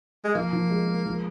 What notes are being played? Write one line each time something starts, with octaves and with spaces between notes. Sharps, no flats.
G#3
F3 A#3
F3
G#3
G#3
F3